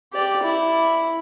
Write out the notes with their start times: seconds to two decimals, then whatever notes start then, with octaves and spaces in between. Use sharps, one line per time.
0.13 G4 D5
0.43 E4